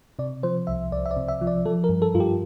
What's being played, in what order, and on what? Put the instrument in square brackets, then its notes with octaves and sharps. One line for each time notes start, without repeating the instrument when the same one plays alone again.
[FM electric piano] C3 D5
F3 C5
C2 E5
C2 D5
E5
D5
C3
E5
F3
D5
F3 A4
A#4
G2
A4
G2 F4
G4